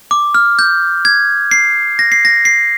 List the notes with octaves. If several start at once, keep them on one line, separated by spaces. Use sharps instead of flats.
D6
F6
G6
G#6
C7
A#6
C7
A#6
C7